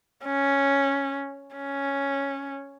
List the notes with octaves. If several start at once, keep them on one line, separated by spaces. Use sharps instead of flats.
C#4
C#4